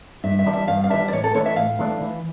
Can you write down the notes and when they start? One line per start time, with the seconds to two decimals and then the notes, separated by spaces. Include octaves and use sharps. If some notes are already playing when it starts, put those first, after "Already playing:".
0.24 G2 E5
0.39 E5
0.46 E3 G3 D4
0.53 E5
0.68 G2 F5
0.84 F5
0.90 E3 G3 D4 E5
1.08 D5
1.12 A2 C#5
1.24 A4
1.35 E3 A3 D4 C#5
1.46 E5
1.56 A2 F5
1.79 E3 A3 D4
2.01 E3